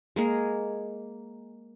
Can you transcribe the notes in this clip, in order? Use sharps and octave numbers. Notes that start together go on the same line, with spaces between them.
G#3 A#3 G#4